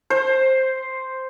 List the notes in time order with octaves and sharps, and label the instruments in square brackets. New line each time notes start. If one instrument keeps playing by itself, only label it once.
[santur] C5